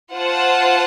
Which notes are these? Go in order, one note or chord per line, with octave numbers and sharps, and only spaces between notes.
F4 C5 F#5 A5